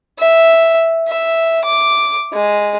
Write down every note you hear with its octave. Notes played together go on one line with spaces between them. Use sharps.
E5
E5
D6
G#3